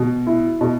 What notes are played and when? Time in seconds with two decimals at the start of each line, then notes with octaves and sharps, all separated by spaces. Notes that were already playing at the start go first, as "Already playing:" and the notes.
Already playing: B2
0.27 E4
0.61 B2